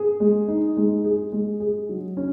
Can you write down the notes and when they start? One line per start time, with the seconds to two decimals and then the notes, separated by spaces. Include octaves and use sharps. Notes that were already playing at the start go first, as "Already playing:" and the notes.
Already playing: G#4
0.20 G#3
0.48 D#4
0.77 G#3
1.04 G#4
1.32 G#3
1.60 G#4
1.89 F#3
2.17 C#4